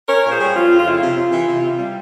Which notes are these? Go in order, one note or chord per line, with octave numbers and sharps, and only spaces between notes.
C#4 A#4 C#5
A#2 A#4
G#4 C5
G3
F2 F4
F2
F4
C#3 E4
C3 F4
C3
E3
C3
C3
G3